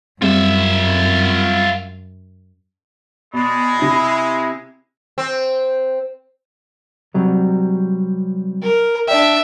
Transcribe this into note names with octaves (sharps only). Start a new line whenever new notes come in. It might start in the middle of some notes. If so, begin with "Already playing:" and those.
F#2 G3 G#3 C4 F4 E5
B2 G#3 D5 B5
C3 E4 A#6
C4
C3 F#3 G3
A#4
D4 D5 E5 G5